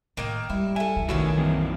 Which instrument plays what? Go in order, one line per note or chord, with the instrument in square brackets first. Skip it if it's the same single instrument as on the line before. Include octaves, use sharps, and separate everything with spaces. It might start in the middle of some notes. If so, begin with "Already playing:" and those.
[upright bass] A2 [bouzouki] D#3 A#3 G5
[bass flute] G3 [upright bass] G#3 [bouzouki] E4
[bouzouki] E4 A4 [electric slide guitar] G#5
[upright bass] G2 E3
[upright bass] B1 F#2 [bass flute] D#3 [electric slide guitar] A3 F#4 [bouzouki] B3 C#4 E4
[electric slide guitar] E3 A#3 C4